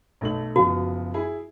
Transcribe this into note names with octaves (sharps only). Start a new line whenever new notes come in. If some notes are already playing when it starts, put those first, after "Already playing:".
B1 A3 F#7
F#1 F3 B3 F#4
E4 G#4 B5